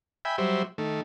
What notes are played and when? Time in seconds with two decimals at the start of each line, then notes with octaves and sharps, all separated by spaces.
0.25 E5 G5 G#5 B5
0.38 F#3 G3 C5 E5
0.78 D#3 A3